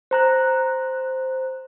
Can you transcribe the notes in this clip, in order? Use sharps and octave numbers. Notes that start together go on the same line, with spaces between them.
C5 A#5 F#6